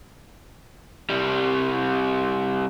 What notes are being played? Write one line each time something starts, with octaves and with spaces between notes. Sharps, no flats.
C2 G3